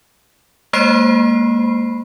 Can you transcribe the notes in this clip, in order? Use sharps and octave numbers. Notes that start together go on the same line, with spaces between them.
G#3 A#3 C5 B5 C7